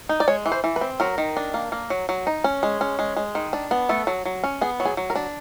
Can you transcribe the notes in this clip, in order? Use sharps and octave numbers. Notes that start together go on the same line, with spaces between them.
D#4
D5
G#3 C#5
E3
C5
E3
B4
C4
F#3 A#4
D#3
D4
A#3
A#3
F#3
F#3
D#4
C#4
G#3
C#4
G#3
G#3
D#3
D4
B3
A3 A4
F#3
F#3
C#4
B3 G#4
F#3
G#4
F#3
A#4
D4